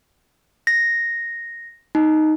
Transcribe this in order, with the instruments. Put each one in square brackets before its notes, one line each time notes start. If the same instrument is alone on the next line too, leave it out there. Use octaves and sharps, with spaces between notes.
[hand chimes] A#6
D#4